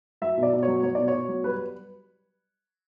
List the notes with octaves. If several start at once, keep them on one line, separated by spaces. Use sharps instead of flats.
F#3 E5
B2
D5
B2
F#3 C#5
F#3 C#5
B2 D5
C#5
B2
F#3
G3 B4